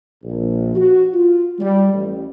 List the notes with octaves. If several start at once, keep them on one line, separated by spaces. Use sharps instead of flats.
A#1
F#4
F4
G3
A1